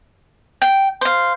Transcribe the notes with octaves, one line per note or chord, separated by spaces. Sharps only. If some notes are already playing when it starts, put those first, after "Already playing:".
G5
C5 F5